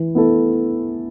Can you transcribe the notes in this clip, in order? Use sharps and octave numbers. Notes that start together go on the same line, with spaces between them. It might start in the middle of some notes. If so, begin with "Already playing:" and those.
Already playing: E3
B3 E4 A4